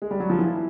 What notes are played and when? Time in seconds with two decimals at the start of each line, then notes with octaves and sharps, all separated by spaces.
0.02 G#3
0.11 G3
0.20 F#3
0.30 F3
0.39 E3